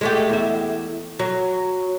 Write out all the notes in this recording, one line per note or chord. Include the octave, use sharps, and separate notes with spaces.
G#3 A3 G4
E2 E5
F#3